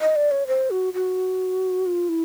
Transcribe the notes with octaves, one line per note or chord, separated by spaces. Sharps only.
D#5
D5
C#5
C5
F#4
F#4
F4
E4